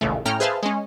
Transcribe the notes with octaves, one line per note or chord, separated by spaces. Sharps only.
A1 D#2 A#2 C#3 A3
A2 C#4 G5 A#5 F6
G#4 B4 C5 E5 F5 A5
G#3 C#4